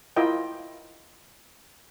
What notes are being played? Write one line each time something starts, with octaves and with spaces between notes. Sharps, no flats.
E4 F4 A#4 D#5 G5